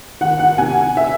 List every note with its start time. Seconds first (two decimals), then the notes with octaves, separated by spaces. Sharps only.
0.21 D#3 F#5
0.39 F#5
0.58 C3 G#5
0.97 E5